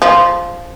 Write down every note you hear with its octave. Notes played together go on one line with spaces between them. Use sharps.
F3